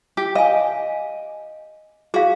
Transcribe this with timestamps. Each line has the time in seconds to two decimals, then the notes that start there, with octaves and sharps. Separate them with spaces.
0.17 G4
0.35 D#5 F5 G#5
2.14 F#4 G#4 F5